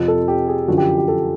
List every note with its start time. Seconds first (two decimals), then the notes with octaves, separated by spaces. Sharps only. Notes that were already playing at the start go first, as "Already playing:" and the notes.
Already playing: F2 C3 F3
0.08 A4
0.28 G4
0.48 G#4
0.68 F#2 D3 F3 F#4
0.78 G4
0.98 G4
1.08 A4